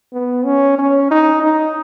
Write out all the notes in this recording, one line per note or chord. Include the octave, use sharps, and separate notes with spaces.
B3
C#4
C#4
D#4
D#4